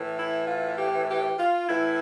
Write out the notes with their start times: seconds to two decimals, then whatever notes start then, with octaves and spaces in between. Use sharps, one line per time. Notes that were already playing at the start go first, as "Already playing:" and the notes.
Already playing: A2 E3
0.16 E4
0.47 F4
0.77 G4
1.08 G4
1.39 F4
1.69 A2 E3 E4